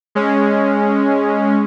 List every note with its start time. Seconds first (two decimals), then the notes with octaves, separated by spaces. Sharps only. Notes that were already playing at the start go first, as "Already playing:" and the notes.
0.15 G#3 C#4